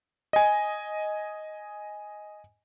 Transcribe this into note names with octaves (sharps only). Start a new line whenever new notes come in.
D#5 G#5